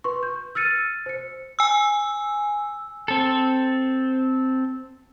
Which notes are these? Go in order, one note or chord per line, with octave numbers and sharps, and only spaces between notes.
B4 C6 C#6
G6
E6 F6 A6 C#7 D#7
C5 C#7
G#5 E6
C4 A4